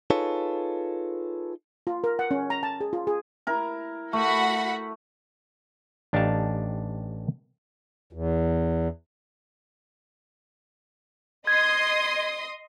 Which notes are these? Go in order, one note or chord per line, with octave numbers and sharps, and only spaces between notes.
D#4 F4 G#4 A4 B4 C#5
F4
A#4
F#5
C#4
A#5
A5
G#4
F4
G#4
E4 A#4
A3 F#4 F#5 B5
A1 D4 D#4 G4 F5 A5
E2
D#5 C6 D#6 G#6